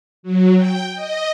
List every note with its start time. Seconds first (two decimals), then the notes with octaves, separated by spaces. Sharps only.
0.23 F#3
0.56 G5
0.95 D#5